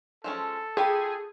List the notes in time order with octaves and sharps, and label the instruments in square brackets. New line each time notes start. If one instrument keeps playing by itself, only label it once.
[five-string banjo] F3 G#3 C#4 [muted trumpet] A4
[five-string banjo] F4 G4 B5 [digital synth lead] G#4